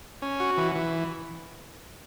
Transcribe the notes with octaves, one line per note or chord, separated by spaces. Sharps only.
C#4
F#4
E3
E3